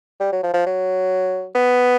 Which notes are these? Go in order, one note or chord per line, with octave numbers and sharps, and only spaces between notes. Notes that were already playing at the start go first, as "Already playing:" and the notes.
G3
F#3
F3
F3
F#3
B3